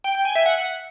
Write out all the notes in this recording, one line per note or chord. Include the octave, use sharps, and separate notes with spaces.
G5
G5
G#5
E5
F#5